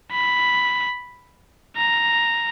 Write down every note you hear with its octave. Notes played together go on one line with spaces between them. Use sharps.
B5
A#5